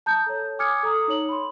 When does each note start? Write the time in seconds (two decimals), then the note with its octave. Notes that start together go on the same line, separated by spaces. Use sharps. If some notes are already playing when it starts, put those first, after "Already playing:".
0.06 A5 A#5 D#6 G6
0.26 A4 C#5
0.59 G#5 D6 D#6 F6 G#6 C#7
0.83 A4 A#5 D#6
1.08 D#4 C#5 F#7
1.29 B5 C6